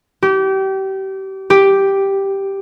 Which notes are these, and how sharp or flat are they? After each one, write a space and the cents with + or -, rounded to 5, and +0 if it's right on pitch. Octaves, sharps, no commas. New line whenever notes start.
G4 -30
G4 +0